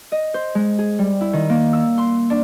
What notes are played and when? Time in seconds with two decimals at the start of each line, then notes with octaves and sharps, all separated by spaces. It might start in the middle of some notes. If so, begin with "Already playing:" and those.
0.12 D#5
0.34 C5
0.55 G#3
0.79 G#4
0.99 G3
1.21 E4
1.33 D#3
1.50 A#3
1.73 E6
1.98 C6
2.30 D4